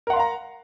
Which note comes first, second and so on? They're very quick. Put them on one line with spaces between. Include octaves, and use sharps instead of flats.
A#4 F#5 C6 F5 A#5